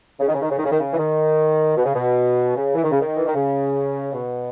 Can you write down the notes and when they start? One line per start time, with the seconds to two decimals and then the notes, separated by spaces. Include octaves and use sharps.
0.20 C#3
0.28 D#3
0.35 C#3
0.42 D#3
0.50 C#3
0.57 D#3
0.65 C#3
0.71 D#3
0.79 C#3
0.94 E3
0.98 D#3
1.77 B2
1.85 C#3
1.95 B2
2.56 C#3
2.75 E3
2.84 D#3
2.91 C#3
3.00 D#3
3.17 E3
3.26 D#3
3.35 C#3
4.12 B2